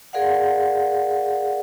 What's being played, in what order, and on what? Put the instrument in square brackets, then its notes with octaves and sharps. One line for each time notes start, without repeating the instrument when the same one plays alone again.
[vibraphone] G#4 A#4 D5 F5 F#5